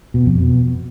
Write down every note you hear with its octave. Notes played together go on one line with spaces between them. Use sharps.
B2
F2
B2